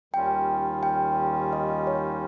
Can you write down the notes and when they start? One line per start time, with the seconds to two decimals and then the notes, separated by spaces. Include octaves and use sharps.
0.13 D#2 D#3 G3 C#4 F4 G5
0.83 G5
1.53 D#5
1.87 C#5